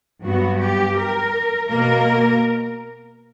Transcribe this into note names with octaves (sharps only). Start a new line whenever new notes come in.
G2 F#3 B3 F#4
G4
A#4
B2 A#3 A#4